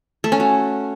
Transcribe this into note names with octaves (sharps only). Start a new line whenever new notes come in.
A3
C#4
F#4